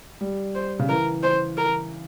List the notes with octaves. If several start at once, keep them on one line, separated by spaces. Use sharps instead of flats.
G3
C5
C#3
E3 A#4
C5
A#4